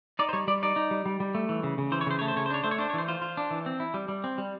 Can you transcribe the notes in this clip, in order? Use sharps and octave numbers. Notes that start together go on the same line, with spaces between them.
D#4 D5
C5
G3 C#5
G3 D5
D#4 D5
D#4
G3
G3
G3
A3
E3
C#3
C#3
E3 C5
C#5
C#3 C5
A3 C#5
C5
C#3 C#5
C5
D4 C#5
A3 C5
C#5
D4 C5
C#5
E3 C5
F4 C5
F4
D4
E3
C4
E4
G3
G3
C4
G3